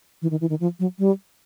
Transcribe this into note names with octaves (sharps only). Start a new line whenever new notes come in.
E3
D#3
E3
D#3
F3
F#3
G3